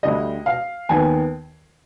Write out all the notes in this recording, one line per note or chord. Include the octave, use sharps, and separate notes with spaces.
D2 D3 G3 D#5
F5
D#2 D#3 B3 G#5